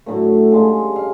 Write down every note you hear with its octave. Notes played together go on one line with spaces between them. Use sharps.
A2 D3 F#3 A3
C#3 G3 G#3
F5